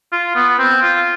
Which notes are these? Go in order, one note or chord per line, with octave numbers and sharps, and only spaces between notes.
F4
B3
C4
F4